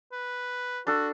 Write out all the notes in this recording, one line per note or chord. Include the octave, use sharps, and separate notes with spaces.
B4
D4 F#4 A4